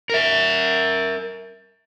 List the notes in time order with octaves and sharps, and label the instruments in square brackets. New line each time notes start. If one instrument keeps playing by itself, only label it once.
[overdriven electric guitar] A#4 E5